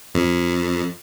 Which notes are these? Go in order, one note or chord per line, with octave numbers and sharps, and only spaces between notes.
F2